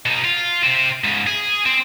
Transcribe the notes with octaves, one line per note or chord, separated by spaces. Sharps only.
B2 D#4
F4
C3 C4
G#2 C#3
G#4
C4